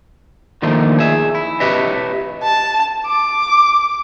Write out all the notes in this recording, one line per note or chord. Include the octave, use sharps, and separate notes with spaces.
D3 D#3 F3 A3 A#3
G#4 E5
E4
E4 G4 B4 C#5 D#5 E5
A5
D6